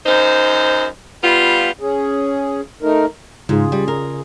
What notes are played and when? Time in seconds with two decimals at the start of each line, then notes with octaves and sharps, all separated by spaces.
0.06 F#2 D#4 C5
1.24 G3 B3 F4
1.79 C#4 G#4
2.83 A3 D#4 A#4
3.49 G#2 C#3 F4 G#4
3.72 G3
3.88 A#4